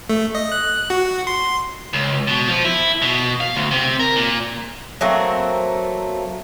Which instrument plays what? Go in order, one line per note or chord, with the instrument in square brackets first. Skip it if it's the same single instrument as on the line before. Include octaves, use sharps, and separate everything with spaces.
[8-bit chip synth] A3
D#5
F#6
F#4
C6
[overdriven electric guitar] C#2
B2
F3
E4
B2
F5
D2
C3
A#4
A#2
[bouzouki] F#3 A3 A#3 C4